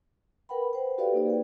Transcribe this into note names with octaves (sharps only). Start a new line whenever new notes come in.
A#4 B4 F#5 G5 B5
C5 G5
F#4 G4 A4 B4 D5 F5
A#3 D#4 D5
G#4 G5